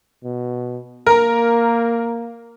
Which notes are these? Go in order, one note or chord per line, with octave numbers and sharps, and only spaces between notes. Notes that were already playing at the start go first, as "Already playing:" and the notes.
B2
A#3 A#4 A#5